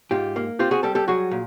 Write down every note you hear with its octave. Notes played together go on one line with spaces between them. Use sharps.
G#2 F4 G4
A#3
C4 F4 G4
F#4 G#4
G3 G4 A4
G4 A4
F#3 F#4 G#4
A#2